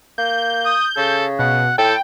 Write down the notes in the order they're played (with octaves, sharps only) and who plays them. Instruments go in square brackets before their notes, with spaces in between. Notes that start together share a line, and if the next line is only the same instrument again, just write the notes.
[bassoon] A#3 [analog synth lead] G6
[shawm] D#6
[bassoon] C#3 [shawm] A4
[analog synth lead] B2 [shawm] F#5
[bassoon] A2 [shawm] A4 [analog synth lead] G5